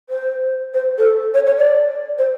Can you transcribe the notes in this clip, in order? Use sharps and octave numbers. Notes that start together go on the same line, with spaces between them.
C5
C5
A4
C#5
C#5
D5
C5